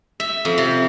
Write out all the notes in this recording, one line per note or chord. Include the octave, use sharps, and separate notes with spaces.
E5
F2
C3